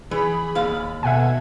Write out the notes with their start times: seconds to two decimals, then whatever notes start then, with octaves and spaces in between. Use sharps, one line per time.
0.11 E3 G#4 B5
0.55 D#2 F5
1.03 B2 A4 E5 F#5 G#5 G#6